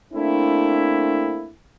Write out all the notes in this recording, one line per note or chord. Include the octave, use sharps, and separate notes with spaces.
A3 A#3 C4 D4 E4